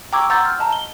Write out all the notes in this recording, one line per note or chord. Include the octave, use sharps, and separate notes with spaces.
G5 A#5 C#6 D6 E6 G#6
F#5 A#5 C6 E6 G6 A6
F6 G6
D#5 A5 A#5
G7